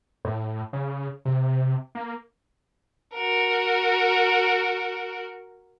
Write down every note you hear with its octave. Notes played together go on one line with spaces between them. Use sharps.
A2
C#3
C3
A#3
F#4 A#4